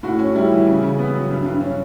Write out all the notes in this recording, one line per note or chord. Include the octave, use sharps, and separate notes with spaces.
A2 F#4
C#4
G3 E4
E3
C#3
C#3
B3
F#3
G2
G2
C#4